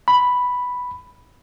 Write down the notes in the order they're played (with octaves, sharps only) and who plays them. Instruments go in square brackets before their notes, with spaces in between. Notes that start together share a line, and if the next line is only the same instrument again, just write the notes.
[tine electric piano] B5